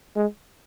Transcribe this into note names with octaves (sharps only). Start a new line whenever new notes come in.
G#3